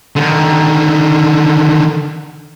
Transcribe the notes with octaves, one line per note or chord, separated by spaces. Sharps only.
D3 D#3